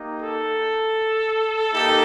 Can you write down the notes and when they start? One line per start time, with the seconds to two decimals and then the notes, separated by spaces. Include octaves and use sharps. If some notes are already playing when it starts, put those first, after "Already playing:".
Already playing: A#3 D#4 G4
0.21 A4
1.73 A#3 D#4 G4 A4